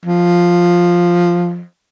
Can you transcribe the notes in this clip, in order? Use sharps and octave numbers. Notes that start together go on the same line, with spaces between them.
F3